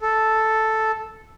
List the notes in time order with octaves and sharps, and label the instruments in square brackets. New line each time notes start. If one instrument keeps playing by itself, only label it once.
[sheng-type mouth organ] A4